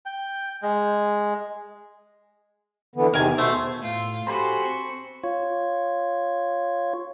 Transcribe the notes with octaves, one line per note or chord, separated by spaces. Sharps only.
G5
G#3
D3 E3 B3
E2 C3 D#3 A#4 G#5
B2 A3 C5
A2 F4
F#4 G4 A4 C5 G#5 B5 C6
C4 C#6
F4 C#5